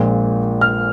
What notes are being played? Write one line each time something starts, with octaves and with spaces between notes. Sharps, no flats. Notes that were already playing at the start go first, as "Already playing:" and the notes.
Already playing: A#1 A#2 G#3
F6